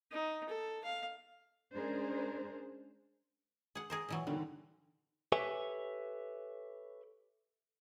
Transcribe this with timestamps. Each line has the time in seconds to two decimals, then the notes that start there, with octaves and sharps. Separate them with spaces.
0.11 D#4
0.49 A4
0.84 F5
1.75 G#3 C#4 D4 G#4 A#4 C5
3.75 G#4 F#5
3.90 G#4 A#4 C5
4.09 A#2 E3 F#3
4.27 D3 D#3 G3
5.32 G4 A4 B4 C#5 E5 G#5